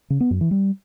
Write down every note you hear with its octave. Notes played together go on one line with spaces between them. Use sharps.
C#3
B3
F#2
E3
G3